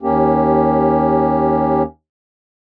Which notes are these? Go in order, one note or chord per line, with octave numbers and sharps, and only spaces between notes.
D#2 A#3 C#4 G4